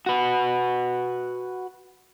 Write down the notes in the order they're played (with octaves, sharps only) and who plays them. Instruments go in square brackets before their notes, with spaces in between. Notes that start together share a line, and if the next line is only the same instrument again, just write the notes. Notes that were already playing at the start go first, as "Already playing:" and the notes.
[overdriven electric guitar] F#4 B4